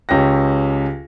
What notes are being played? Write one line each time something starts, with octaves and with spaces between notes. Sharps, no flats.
C#2 C#4 G4 A#6